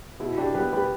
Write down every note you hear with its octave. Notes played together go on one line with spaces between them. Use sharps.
B2 E4
D4 G4
G3 B3 G4 B4
G4 B4